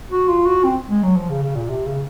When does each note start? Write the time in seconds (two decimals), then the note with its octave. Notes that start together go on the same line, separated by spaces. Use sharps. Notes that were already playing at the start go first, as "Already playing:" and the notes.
0.11 F#4
0.28 F4
0.46 F#4
0.64 C4
0.90 G#3
1.03 F#3
1.16 F3
1.29 C#3
1.42 C#3
1.55 A#2
1.69 C3
1.85 C#3